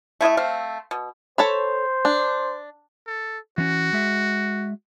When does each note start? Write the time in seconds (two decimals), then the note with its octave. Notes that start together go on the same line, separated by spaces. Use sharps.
0.21 A3 E4 D#5 E5
0.37 A3 C4 F5
0.91 B2
1.38 A4 C5 C#5 B5
2.05 D4
3.07 A4
3.58 E3 C#4 F#4
3.93 G#3 E5